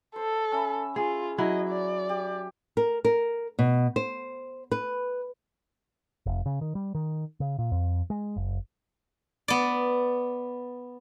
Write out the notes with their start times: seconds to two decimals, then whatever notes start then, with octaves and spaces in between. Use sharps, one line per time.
0.16 A4 C5
0.52 C#4 E5 B5
0.96 F4 G#4
1.38 F#3 E4 D#5
1.69 D5
2.09 G4
2.77 A#4
3.04 A#4
3.59 B2
3.96 C5
4.72 B4
6.26 F1
6.46 C#3
6.61 D#3
6.75 G3
6.95 D#3
7.40 C#3
7.59 A#2
7.72 F2
8.10 G#3
8.36 F#1
9.48 B3 D5